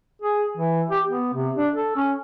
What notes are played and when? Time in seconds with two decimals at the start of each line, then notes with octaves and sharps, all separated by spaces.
0.22 G#4
0.57 E3
0.90 G4
1.07 B3
1.34 C3
1.56 D4
1.75 A4
1.96 C#4